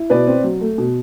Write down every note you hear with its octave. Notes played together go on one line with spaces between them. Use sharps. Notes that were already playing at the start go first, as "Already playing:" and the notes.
Already playing: E4
B2 B4 D5
C4
F#3
A3
B2